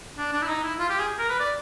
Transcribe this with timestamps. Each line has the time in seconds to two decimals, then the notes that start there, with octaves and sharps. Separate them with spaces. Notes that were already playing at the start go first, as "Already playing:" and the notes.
0.18 D4
0.33 D4
0.42 E4
0.48 D#4
0.63 E4
0.79 F4
0.89 G4
0.99 G#4
1.19 A#4
1.29 B4
1.39 D5